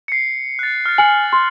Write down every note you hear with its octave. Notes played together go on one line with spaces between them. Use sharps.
C7 C#7
F#6 A6
F6 A6
G#5 F6 F#7
C6